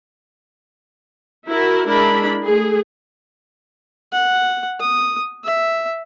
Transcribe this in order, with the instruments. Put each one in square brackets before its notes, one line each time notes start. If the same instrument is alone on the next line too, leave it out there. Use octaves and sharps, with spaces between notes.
[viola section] E4 F#4 A#4
G#3 D4 E4 A#4 B5
A3 G#4
[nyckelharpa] F#5
D#6
E5